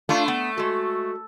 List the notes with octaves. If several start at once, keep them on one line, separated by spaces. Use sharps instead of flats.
A3 D4 F4 F5
B3
G#3 F#4 A4